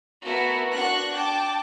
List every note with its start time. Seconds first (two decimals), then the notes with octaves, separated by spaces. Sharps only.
0.23 A3 B3 E4 F#4 A#4
0.73 D4 F#4 C#6 F#6
1.12 G5 A5 D6